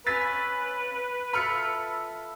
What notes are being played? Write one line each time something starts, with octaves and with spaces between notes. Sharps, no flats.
C#4 B4 F5 G#5 E6 A6 B6
F4 A4 E5 B5 F6 C#7